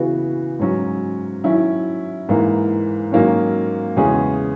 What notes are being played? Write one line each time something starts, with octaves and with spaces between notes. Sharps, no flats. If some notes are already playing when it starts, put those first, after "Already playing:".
Already playing: C#3 E3 B3 F#4
G#2 F#3 C#4
D#3 F#3 C#4 E4
G#2 E3 A#3
G#2 D#3 F#3 A#3 C#4
E2 C#3 G#3 C#4 G#4